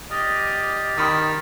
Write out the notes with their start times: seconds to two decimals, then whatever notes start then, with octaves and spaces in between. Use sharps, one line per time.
0.10 G4 D5 D#5 F6
0.98 D#3 B5 D#6